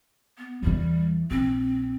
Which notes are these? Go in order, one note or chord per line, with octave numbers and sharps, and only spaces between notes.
B3
E2 E3 G3
A#1 C4